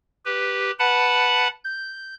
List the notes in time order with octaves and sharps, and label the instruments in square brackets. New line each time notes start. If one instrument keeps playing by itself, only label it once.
[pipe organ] G4 B4
B4 F#5 A5 B5
G6